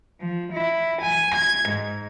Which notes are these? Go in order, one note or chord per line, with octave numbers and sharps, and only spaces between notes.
F3
E4
G#5
G#6
G#2